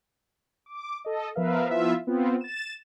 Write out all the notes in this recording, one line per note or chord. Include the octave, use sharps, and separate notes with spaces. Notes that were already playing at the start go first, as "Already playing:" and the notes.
D6
A4 D#5
F3 B3 A#4 B4 E5 F5
F3 B3 E4 F4 E5
B3 C4 F4
A6 E7